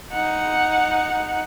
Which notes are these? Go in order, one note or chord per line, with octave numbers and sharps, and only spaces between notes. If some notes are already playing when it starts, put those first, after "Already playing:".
D#4 F#5